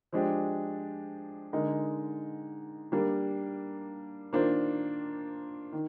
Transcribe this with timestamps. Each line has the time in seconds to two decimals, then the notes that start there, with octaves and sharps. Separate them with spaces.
0.13 F3 G#3 D4 G4
1.53 D3 G#3 D#4 A#4
2.92 G3 A#3 D4
4.33 D#3 A#3 D4 F4 C5
5.73 D#3